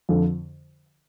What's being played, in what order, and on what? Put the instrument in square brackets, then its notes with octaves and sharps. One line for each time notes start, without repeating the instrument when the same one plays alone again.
[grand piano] F2 D3 F3